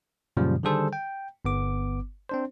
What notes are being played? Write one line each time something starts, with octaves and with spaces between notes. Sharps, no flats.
F#2 A#2 C#3 F3 G3
D3 D#3 G3 G#4 A4 C5
G5
G1 B3 D6
C4 D4 C5